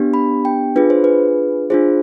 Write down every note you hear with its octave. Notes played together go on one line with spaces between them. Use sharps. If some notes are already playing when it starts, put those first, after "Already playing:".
Already playing: B3 D4 G4
B5
G5
D4 F4 G#4 B4
C5
B4
D4 F4 G#4 C5